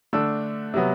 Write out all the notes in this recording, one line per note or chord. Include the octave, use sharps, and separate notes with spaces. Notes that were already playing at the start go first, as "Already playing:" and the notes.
D3 A3 D4 E6
C3 F#3 B3